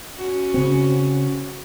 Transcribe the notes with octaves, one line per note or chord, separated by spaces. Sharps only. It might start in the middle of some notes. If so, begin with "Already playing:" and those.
C#4 F#4
C#3 C4